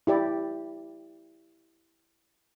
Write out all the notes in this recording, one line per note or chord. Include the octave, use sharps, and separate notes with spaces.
E4 G4 D5